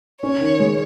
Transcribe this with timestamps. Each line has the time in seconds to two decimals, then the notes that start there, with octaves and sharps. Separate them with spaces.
0.22 C#4 C#5
0.41 D#3
0.59 G#3